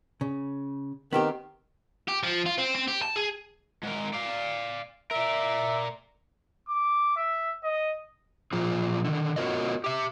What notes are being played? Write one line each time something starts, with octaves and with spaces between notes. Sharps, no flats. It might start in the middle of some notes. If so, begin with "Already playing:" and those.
C#3
D#3 B3 C4 G4
G4
F3
F4
C4
C4
G4
A5
G#4
G#2 A#4
D5 F5
A#4 D5 E5
D6
E5
D#5
A#2 F3 F4 G#4
D3 D#3
B3 F4 F#4 A#4 C#5 D#5
G4 E5